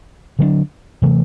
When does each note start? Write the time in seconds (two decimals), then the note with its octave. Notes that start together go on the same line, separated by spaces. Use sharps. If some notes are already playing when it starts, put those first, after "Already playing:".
0.39 D3 F#3 A3 D4
1.02 C3 E3 A3